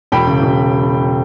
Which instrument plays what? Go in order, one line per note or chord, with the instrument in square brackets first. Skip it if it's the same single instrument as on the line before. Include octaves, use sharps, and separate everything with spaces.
[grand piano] E1 G5 B5
C#3
E1